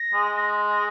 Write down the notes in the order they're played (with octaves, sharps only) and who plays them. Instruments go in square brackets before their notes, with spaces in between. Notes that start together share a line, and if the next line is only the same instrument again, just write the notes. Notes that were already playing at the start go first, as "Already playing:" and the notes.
Already playing: [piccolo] A#6
[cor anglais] G#3
[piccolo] A#6